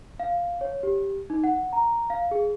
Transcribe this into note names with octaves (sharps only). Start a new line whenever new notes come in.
F5
C#5
G4
D#4
F#5
A#5
F5
G#4